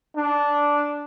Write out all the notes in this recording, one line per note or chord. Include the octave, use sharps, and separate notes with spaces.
D4